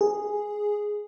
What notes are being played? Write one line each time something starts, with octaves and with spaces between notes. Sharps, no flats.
G#4